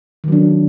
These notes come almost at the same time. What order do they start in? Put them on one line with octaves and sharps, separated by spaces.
D#3 F#3 D4